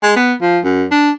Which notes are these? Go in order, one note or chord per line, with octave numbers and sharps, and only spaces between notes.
G#3
B3
F3
F#2
D4